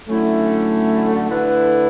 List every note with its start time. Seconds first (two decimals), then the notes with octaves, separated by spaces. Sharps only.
0.05 D3 F#3 A3 C#4 E4
1.29 D3 A3 E4 B4